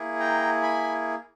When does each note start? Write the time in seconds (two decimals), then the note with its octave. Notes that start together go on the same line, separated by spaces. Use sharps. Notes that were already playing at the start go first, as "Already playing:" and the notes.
Already playing: A#3 E4 G#4
0.19 G5 A#5
0.62 G#5 B5